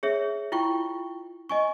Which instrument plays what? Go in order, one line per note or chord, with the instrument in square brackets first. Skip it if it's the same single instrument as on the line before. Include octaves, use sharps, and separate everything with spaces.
[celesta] G#4 C#5 E5
E4 F4 G5 C#6
D#5 G#5 C#6